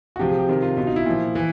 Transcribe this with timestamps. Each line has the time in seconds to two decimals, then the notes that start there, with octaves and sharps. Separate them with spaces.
0.16 F#4
0.19 C3 F3 G4
0.29 G#4
0.39 G4
0.49 C3 D#3
0.62 F4
0.77 B2 F4
0.87 D#4
0.96 E4
1.06 A#2 F3
1.35 E3